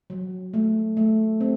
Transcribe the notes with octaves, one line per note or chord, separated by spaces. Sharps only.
F#3
A3
A3
C4